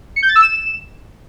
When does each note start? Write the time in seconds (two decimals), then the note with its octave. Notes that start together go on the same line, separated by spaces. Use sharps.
0.16 C#7
0.23 G6
0.29 A6
0.35 E6
0.42 E7